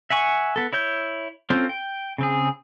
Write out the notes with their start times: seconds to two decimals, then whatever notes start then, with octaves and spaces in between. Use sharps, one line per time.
0.10 E5 F#5 G#5 C#6
0.56 B3 A4
0.73 E4 C#5 G6
1.50 C4 C#4 F4 A4 C5
1.69 G5
2.18 C#3 C4 G#4